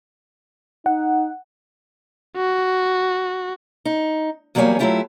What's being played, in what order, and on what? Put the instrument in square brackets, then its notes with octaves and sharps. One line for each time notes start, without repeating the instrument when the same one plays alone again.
[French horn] D#4 [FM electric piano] F#5
[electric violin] F#4
[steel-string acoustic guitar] D#4
E2 F#3 G3 A#3 C#5 G#5
F#3 G#3 A3 E4 F4 G4